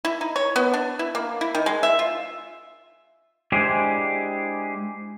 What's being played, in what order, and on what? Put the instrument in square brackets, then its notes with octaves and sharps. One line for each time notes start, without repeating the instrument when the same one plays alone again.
[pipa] E4
D#4
C#5
B3
D4
E4
A#3
E4
D#3
G#3
E5
F4
[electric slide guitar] G#3 D4 E4 G4 G#4 C5